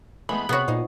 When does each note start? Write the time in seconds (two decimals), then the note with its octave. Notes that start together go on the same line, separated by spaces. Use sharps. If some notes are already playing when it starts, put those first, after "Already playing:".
0.29 E3 G#3 A3 B3 B5
0.49 C3 B3 F#4 G#4 B4 C#5
0.68 A#2 D#4 C5